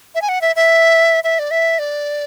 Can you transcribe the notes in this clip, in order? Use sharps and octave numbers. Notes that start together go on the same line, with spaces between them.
E5
G#5
F#5
E5
E5
E5
D5
E5
D5